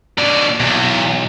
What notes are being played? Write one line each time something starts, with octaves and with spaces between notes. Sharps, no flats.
B2 D3 D5
B1 E2